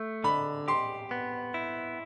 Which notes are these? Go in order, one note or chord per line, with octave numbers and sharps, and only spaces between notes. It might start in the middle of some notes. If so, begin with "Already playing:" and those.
Already playing: A3
D3 B5
G4 C6
B3
E4